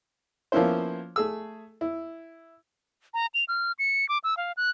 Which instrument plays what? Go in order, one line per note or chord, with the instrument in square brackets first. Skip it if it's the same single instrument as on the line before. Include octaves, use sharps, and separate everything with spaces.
[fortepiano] F3 A#3 B3 C#4 E4 C5
A3 G#4 E6
E4
[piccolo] A#5
F7
F6
C#7
D6
E6
F5
F#6